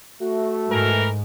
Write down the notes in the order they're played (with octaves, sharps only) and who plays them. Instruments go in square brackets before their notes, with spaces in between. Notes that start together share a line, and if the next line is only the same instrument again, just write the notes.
[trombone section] A3 [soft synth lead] F#4
[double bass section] G#2 [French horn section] E3 A#4